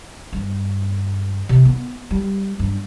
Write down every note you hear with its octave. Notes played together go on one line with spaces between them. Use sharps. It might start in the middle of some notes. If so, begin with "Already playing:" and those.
G2
C3
B3
G3
G2